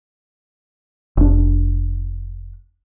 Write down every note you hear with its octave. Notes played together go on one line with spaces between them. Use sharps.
F1 D4